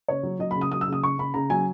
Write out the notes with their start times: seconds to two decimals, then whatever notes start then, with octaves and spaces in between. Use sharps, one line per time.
0.08 C#3 C#5
0.23 F#3
0.39 F#3 D#5
0.51 B5
0.56 C#3
0.61 D#6
0.72 F#3 D#6
0.81 E6
0.88 C#3 D#6
1.04 C#3 C#6
1.18 C#3 B5
1.34 C#3 A#5
1.50 F#3 G#5